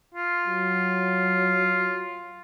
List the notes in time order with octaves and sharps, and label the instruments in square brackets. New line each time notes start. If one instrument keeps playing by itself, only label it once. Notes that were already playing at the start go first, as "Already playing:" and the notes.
[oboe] F4
[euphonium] F#3